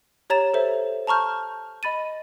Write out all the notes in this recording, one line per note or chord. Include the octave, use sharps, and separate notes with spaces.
G4 C#5 A#5 A6 E7
A4 C5 E5
A5 A#5 C#6 F6 G6
D#5 B5 A6 D#7